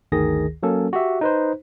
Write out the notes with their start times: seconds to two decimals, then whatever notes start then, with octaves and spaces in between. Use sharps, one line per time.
0.12 G1 D2 D#3 G#4 A#6
0.63 F#3 A#3 C#4 A4
0.93 F#4 G4 E5
1.21 D#4 B4 C5